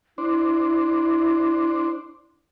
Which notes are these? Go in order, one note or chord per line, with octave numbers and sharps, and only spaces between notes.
D4 E4 C5